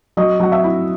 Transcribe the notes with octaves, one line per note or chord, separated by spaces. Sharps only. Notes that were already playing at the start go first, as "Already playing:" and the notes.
F#3 D#5
F#3 F#5
E5
E4